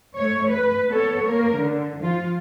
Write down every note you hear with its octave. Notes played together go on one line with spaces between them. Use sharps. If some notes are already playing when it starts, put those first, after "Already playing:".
A3 C#5
B4
B3 A4 C#5
A#3 A#4
D3
F3 F4